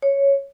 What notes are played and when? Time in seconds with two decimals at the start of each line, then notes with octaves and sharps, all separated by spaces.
0.02 C#5